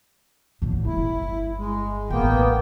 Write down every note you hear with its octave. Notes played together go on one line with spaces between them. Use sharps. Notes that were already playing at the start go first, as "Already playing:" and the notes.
A2 D3
G1 G2 E4
G#3
A1 D2 A#3 B3 G5